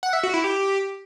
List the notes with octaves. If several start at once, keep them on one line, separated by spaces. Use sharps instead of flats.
F#5
E5
F#4
E4
G4